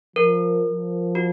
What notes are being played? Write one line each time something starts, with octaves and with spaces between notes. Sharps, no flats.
F3 A#4
F3
F#4